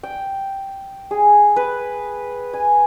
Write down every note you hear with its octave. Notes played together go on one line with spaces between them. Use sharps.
G5
G#4
B4
G#5